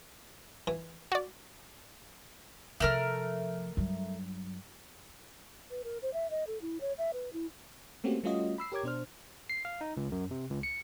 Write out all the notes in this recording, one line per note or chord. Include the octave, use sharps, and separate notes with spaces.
E3
F#4 D5
C3 F3 A3 A#4 F6
G2 F#3
B4
A#4
C5
E5
D#5
A4
E4
C#5
E5
B4
E4
A3 A#3 C4 C#4 F#4 G4
G3 A3 C#4 F4 F#4 D#5
B5 E6 C7
G4 A#4 C#5 D6 G#6
B2 D4 C5 F6
C7
F5
D#4
C#2
F#2
C3
C#2
C#7